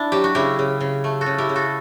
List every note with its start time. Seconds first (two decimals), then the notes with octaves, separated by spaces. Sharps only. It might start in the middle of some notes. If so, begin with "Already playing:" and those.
Already playing: D4 E4
0.12 F#3 G4
0.24 F#4
0.35 C#3 E4 G4
0.59 C#3
0.81 C#3
1.04 A3
1.21 F#4 A4
1.26 C#3
1.38 E4 G4
1.49 C#3
1.56 F#4 A4